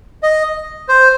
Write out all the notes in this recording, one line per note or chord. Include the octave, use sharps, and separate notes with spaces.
D#5
C5